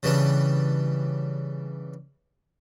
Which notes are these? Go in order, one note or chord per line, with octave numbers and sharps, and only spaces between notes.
C#3 E3 G3 D4